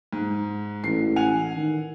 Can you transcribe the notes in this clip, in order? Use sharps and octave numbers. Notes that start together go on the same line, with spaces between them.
G#2
A1 C7
F#5 G#5 F7
D#3